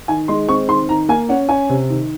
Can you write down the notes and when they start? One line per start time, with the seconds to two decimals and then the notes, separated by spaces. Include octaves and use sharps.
0.08 D#3 G#5
0.28 G#3 C6
0.49 C4 C#6
0.68 D#3 C6
0.89 D#3 A#5
1.09 A#3 G#5
1.29 C#4 F#5
1.49 C#4 G#5
1.70 C3
1.90 D#3